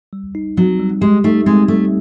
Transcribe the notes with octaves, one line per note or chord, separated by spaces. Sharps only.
G3
D#4
F#3 C4
G3
G#3 G4
A3 D#4
G#3 C4
G3 A3